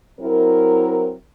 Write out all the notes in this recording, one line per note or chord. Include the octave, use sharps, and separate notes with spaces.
F#3 C4 E4 A#4